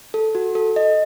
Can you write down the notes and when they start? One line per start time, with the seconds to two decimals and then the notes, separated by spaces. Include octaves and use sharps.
0.14 A4
0.35 F#4
0.55 A4
0.76 D#5